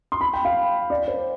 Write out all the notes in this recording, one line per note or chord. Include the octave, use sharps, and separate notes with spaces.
C6
B5
G5
F5
D5
C5